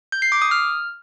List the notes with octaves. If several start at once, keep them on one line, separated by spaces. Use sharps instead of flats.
G6
C7
D6
D#6
F6